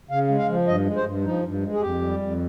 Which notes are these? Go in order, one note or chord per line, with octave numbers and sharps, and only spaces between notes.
C#3 F5
G#3
F5
F3
G2 D#5
G#3
C5
G2
F3 D#4
G2
G#3
G#4
F2 G4
G3
F2